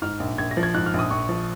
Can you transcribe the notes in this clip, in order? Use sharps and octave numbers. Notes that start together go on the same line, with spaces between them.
G#2 F6
A#1
A#1 G#6
A#6
F3
G#6
G#2 F#6
F6
A#1
D#6
A#1 C#6
F3